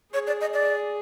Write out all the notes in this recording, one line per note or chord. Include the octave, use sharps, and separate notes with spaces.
G#4 C#5
D5
D#5
D5